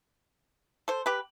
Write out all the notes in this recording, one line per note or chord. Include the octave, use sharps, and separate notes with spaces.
A4 C5
G4 B4